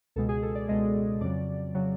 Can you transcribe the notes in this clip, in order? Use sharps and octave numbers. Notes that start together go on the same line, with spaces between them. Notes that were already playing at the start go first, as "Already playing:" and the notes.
C#2 B2 G#3 A4
G#4
A4
D5
C#2 B2 G#3 D#5
F2 C#3 F#3 D5
C#3 F#3